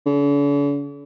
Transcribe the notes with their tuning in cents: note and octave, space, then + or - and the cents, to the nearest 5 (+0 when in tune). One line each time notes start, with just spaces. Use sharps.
D3 -45